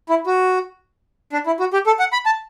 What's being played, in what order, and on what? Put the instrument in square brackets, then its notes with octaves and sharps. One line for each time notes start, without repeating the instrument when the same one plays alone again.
[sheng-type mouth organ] E4
F#4
D4
E4
F#4
G4
A4
F#5
B5
A5